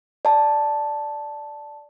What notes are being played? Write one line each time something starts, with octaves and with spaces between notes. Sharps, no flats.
D5 A5